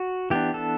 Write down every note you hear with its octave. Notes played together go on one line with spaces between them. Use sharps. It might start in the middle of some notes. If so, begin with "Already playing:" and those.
Already playing: F#4
E3 B3 D4 G4
A4